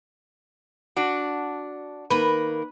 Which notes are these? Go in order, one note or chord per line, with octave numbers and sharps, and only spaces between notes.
D4 F#4
D#3 A#3 A#4 B4